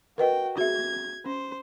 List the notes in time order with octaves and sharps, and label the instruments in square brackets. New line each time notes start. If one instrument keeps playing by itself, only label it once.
[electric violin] F#4 G5 [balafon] A#4 B4 D#5
[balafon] F#4 G#4 E5 [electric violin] G#6
[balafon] C#4 [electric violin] C5